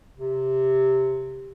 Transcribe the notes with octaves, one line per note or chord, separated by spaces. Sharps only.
C3